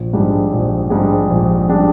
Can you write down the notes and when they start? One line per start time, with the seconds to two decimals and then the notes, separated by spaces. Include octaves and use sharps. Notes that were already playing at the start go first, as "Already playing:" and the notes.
Already playing: A#1
0.13 G#2 G3 D4 G#4
0.52 A#1
0.90 G#2 G3 D4 G#4
1.30 A#1
1.69 G3 D4 G#4